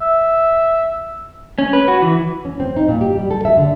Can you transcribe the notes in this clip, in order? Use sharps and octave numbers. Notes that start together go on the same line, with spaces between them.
E5
C#4
B4
F#4
E3
C#4
C4
D#4
A#2
G4
G3
A4
E5
D3